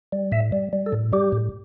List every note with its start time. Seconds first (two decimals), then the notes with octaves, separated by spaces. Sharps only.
0.12 G3
0.32 A2 E5
0.52 G3
0.73 G3
0.86 A4
0.93 A2
1.13 G3 G4
1.32 A2